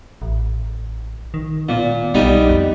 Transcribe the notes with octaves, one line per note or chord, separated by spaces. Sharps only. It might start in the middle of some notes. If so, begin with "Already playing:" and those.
A1
D#3
A#2 B3
B1 G3 B3 D#4
F2